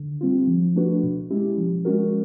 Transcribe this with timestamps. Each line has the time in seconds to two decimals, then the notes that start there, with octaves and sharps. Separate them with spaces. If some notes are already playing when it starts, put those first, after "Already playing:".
Already playing: D3
0.21 G3 C4 F4
0.47 F3
0.76 A3 D4 F#4 B4
1.03 B2
1.30 G#3 C#4 E4 G4
1.58 F3
1.85 G#3 C#4 F#4 A#4